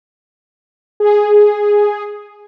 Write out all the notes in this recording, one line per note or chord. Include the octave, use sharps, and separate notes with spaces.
G#4